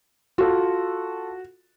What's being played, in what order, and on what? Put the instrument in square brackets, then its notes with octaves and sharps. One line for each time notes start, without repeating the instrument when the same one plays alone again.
[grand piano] F4 A4 [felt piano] F#4